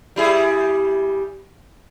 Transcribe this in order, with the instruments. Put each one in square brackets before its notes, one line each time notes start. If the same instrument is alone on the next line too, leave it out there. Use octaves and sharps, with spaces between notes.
[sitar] G3 E4 G#4